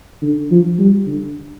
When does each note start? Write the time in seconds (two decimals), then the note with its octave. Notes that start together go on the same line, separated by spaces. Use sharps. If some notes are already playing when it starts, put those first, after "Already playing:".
0.22 D3
0.51 F3
0.78 G3
1.07 D3